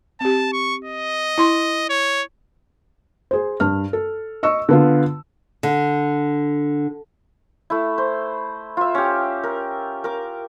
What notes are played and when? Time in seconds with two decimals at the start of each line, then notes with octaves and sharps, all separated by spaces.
0.21 C4 G4 A5
0.53 C#6
0.85 D#5
1.38 E4 C6
1.90 C#5
3.31 G#4 C5
3.60 G2 F6
3.93 A4
4.43 D#5 C#6 E6
4.69 D3 B3 F4
5.63 D3
7.70 A3 E4
7.98 C5
8.77 F4 E5
8.95 C#4 G4
9.43 A#4
10.04 A#4 D6